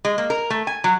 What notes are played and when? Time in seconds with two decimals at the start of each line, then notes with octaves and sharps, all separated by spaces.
0.05 G#3
0.18 A#3
0.30 A#4
0.50 A3
0.67 G#5
0.84 F#3